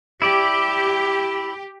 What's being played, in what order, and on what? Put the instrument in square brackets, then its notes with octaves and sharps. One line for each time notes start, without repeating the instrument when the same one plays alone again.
[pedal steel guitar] E4 D5 [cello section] G4